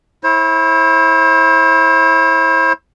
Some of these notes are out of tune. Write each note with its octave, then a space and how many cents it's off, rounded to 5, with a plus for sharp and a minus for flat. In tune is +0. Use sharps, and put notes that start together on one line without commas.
E4 -10 C5 +40